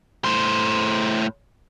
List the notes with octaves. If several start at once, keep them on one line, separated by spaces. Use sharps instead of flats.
A2 C5